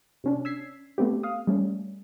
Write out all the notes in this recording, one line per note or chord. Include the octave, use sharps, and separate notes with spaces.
C3 C#4 D4
E6 G#6 B6 C7
A3 B3 C4 G4
F5 D#6
G3 A3 C#4